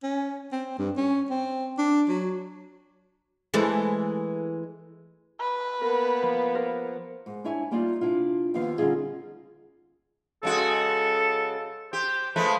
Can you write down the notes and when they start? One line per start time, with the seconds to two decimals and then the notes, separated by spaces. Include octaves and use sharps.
0.03 C#4
0.52 C4
0.79 G2
0.97 C#4
1.30 C4
1.78 D4
2.09 F#3
3.54 E3 G#3 A3
5.40 B4
5.81 A#3 B3 A#4
6.22 F3
6.55 A#4 C5
7.26 G#2
7.44 D4 E4 C#5 E5 G#5
7.71 G3 A#3 D#4 F4 D5
8.01 C3 D4 E4 F4
8.54 D#2 F3 B3 F5
8.78 D3 G3 C#4 D#4 F4 G#4
10.43 C#3 G#3 F#4 A4
11.93 G4 C5
12.36 F3 G#3 A3 B4